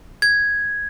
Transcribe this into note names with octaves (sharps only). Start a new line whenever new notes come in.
G#6